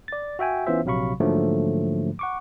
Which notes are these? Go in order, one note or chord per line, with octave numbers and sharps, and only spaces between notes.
D5 A6
F#4 E5 G5 G#5
E3 B3 C#4 F4 C5 E5
A#1 C3 F#3 F5 B5 C#6
G#2 D3 F3 F#3 A3 A#3
F#5 C#6 D6